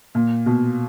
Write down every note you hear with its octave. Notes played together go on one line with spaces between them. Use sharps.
A#2
B2